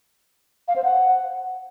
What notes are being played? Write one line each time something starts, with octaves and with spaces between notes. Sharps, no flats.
F5
C5
F#5